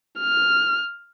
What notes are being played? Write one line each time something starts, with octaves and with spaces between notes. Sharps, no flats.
F6